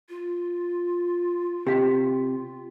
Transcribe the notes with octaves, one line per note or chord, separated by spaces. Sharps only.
F4
C3 G4 F5 G5